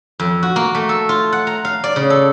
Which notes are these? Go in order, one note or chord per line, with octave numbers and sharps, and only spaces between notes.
F2
F#4
A#3
A3
A4
F4
F#5
A#5
F5
D5
C#3
A4